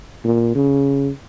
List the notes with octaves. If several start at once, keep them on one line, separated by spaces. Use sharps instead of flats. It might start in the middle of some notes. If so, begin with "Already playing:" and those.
A#2
C#3